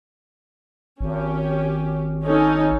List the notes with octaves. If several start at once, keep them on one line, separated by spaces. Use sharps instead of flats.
G#1 C#4 G4
C#4 D#4 A4